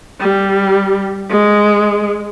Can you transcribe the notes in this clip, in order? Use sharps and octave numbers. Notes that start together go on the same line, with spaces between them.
G3
G#3